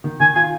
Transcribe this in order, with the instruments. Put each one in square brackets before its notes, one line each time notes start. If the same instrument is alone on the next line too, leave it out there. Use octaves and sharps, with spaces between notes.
[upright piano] D#3
[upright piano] D#3 [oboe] G#5
[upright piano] F4 [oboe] G#5